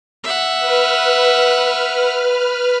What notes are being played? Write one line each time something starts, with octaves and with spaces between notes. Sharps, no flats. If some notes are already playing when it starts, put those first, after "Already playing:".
E5 F#5
B4 F6